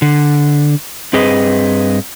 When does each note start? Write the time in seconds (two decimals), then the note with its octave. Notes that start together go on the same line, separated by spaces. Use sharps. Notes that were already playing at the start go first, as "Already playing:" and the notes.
0.02 D3
1.13 G2 C4 G#4 B4 D#5